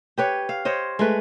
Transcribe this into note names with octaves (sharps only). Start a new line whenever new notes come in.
G4 B4 C#5
F5
C5 C#5 D#5
G#3 A3 B4